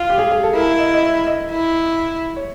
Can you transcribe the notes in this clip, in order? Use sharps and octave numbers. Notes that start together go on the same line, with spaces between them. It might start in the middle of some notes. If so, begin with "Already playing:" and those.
Already playing: F4
G4
G#4
G#4
A4
E4 A#4
E5
D#5
D#5
E5
D#5
E4
C#5